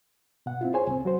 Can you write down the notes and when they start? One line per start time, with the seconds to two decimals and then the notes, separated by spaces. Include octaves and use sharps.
0.46 B2 F#5
0.61 C4 E4 F4
0.74 G#4 C5 C#5 G#5
0.87 C2 C4
1.05 F#3 F#4 C5